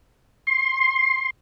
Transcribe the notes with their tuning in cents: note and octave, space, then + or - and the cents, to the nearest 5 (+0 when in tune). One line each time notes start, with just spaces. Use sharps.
C6 +20